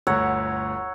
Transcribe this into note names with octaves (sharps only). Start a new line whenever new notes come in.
G1 D2 C#5 F#5 A#5 E6